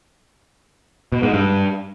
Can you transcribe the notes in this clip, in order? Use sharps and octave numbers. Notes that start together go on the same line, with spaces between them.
B2
G#2
G2